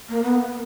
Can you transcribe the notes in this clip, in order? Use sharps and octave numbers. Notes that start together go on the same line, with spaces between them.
A#3
B3